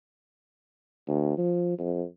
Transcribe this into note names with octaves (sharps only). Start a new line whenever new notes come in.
D2
F3
F2